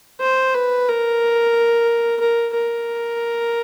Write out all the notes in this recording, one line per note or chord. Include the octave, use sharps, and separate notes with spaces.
C5
B4
A#4
A#4
A#4